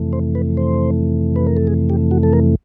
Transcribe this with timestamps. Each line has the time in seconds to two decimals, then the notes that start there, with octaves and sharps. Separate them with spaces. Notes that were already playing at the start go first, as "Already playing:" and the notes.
Already playing: F2 C3 E3 A3
0.13 C5
0.35 B4
0.57 C5
1.36 B4
1.47 A#4
1.57 A4
1.67 G#4
1.90 G4
2.11 F#4
2.23 A4
2.33 A#4